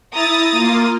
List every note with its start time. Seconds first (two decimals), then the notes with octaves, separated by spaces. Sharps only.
0.14 E4 A#5 D#6 A6
0.51 A#3 F4